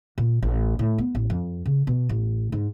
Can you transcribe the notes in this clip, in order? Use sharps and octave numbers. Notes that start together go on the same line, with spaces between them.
A#2
A1
A2
B3
A1
F2
C#3
B2
A1
G#2